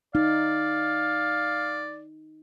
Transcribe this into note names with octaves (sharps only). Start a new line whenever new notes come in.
D#4 D5 F5